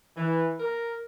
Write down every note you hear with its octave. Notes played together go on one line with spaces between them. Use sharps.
E3
A#4